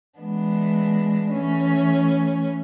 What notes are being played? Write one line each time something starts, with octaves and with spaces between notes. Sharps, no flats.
E3 G#3 B3 D4
E3 A3 C#4